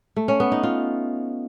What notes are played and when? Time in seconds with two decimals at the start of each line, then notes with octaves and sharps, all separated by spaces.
0.16 A3
0.28 C#4
0.40 B3
0.52 D#4
0.63 F4